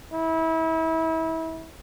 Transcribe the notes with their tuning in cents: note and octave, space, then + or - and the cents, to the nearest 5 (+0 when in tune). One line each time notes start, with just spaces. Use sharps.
E4 -30